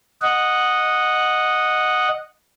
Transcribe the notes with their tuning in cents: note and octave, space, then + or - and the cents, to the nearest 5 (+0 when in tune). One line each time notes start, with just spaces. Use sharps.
D#5 -5 F#5 -5